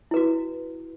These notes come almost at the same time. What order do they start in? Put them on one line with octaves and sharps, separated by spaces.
E4 B4 F#4